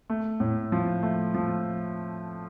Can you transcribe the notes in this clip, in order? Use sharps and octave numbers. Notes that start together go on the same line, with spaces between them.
A3
A2
F3
A3
F3